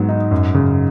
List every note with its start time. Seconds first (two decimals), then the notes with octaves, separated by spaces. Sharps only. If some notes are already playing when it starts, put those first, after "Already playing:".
Already playing: G#2 F#3 B3
0.09 D#4
0.31 F#2
0.54 C#3